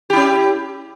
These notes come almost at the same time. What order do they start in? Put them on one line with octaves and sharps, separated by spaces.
G4 E4 C#4